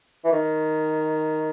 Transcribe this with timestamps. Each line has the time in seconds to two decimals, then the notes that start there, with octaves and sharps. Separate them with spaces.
0.25 E3
0.32 D#3